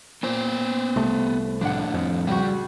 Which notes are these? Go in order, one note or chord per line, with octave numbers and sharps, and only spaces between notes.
A#2 B3 C5
C2 A3
A2 F3 D4 F#5
F2
C#2 G3 F#4